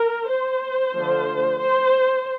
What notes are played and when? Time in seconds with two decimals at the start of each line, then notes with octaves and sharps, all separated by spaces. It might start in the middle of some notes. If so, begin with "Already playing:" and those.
Already playing: A#4
0.29 C5
0.95 D3 F3 A3
1.60 C5